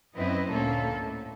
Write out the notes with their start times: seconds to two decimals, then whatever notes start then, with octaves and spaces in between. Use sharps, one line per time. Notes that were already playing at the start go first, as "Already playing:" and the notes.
0.15 F#2 C4 E4 B4 D#5
0.49 D2 A#2 A#3 C#4 A4
0.96 A2